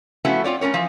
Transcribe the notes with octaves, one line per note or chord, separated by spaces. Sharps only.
F3 A3 B3 C#4 E4 F#4
C4 F4 C#5 D5
A3 C#4 A#4 C#5
E3 F3